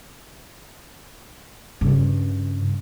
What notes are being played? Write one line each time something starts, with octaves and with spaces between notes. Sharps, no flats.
G2 C#3